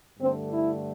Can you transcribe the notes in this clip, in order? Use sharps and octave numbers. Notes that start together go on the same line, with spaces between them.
G2 D3 A3 C4
E4